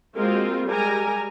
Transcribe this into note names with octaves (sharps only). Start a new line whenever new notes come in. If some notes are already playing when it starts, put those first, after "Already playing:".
G#3 A#3 C4 F4 F#4 A#4
G3 G#3 G4 A#4 G#5 A#5